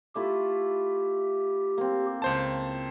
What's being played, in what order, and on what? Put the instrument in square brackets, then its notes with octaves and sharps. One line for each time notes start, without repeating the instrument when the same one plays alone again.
[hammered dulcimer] A3 E4 F4 [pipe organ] G4
[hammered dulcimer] A#3 C4
[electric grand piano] C#2 C5 A5